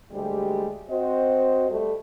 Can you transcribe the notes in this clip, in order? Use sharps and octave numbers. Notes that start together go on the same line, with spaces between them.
D2 G3 G#3 G4
C4 F#4 C5 D#5
G3 A3